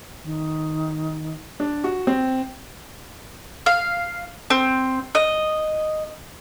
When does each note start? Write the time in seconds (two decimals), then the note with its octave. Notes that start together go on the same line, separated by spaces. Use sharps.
0.24 D#3
1.60 D4
1.84 F#4
2.07 C4
3.66 F5
4.50 C4
5.15 D#5